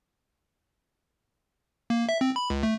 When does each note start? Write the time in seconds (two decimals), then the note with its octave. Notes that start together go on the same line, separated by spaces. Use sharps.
1.90 A#3
2.09 E5
2.21 C4
2.36 B5
2.50 C#2
2.63 A3